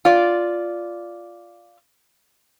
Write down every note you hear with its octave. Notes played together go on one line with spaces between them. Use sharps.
F4 D5